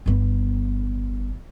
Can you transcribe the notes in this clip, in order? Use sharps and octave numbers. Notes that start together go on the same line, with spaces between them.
G1 B3